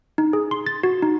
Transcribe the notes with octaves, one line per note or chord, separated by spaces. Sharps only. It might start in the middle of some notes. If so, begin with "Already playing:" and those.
D#4
G#4
C6
A6
F#4
D#4